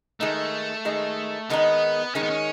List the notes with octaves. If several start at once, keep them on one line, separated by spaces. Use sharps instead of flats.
D#3 G#3 A3 D#4
D#3 G#3 D#4
D#3 G#3 B3 D#4
D#3 G#3 C#4 D#4
B3
C#4